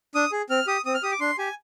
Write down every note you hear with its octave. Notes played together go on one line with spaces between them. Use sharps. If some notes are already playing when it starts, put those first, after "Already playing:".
D4 D#6
G#4
C4 F6
G4 D#6
C4 D#6
F6
G4 D#6
D6
D4 C6
G4 G#5